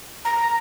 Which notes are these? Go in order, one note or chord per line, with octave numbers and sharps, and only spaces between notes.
A#5